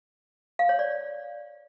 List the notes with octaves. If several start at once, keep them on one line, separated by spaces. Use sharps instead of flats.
F5
C#5
D5